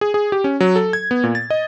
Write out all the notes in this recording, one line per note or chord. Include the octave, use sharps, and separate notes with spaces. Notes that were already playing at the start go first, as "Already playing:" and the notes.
G#4
G#4
G4
C#4
F#3
A4
G#6
B3
A#2
A6
D#5